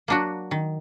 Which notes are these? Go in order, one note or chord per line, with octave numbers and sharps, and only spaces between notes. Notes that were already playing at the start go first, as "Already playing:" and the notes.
F#3 A#3 D4 F#4
D#3